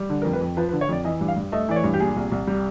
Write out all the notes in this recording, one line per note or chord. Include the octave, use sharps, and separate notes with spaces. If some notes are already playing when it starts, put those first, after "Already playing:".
Already playing: G3
D3
F2 A#4
B4
F2
F3 B4
B4
D3
C#5
F2 D5
E3 D#5
G2
F5
G2
A3 D#5
E3 D5
C#5
G2
G4
A#2 G#4
C2
C2
G3